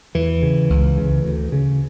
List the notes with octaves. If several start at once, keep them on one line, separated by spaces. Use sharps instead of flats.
E2 E3
C#3
C#2
C#3
D2
C#3